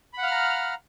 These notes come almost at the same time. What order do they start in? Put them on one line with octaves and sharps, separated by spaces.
B5 F#5 F5 F6 A#5